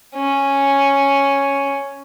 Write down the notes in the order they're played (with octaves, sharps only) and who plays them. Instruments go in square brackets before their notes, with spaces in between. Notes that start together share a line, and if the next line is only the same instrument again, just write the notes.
[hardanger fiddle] C#4